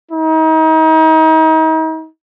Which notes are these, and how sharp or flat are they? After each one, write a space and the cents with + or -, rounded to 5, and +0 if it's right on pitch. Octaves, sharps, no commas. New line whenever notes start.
D#4 +35